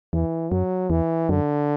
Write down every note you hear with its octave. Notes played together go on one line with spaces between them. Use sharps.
E2 E3
F#2 F#3
E2 E3
F#2 D3